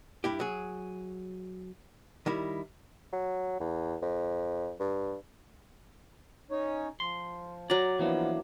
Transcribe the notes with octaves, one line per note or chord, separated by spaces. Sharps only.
G2 E4 G4
F#3 G#4
D#3 G3 E4
F#3
E2
F2
G2
C#4 D#4 C#5
F3 C6
F#3 D5 A#5
E3 F3 A#3 B3 D4